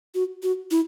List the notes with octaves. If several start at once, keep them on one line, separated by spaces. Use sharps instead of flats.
F#4
F#4
E4